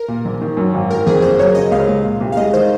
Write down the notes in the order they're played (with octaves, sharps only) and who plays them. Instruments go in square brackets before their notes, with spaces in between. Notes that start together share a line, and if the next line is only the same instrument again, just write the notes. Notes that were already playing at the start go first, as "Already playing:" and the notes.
Already playing: [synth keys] A#4
[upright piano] A#2
A#1
D#3
F#2
G#1
[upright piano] D#3 [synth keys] A#4
[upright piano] F2 [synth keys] G#4
[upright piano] F#1 [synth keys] C5
[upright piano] F#3 [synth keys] C#5
[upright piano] C#3 [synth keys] D#5
[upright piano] C#2 [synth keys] F5
[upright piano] G#3
A#2
C2
[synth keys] F5
[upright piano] G#3 [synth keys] D#5
[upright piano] D#3 [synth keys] C5